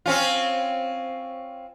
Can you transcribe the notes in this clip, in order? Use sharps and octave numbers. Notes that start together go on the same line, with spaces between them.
C4 C#4 F4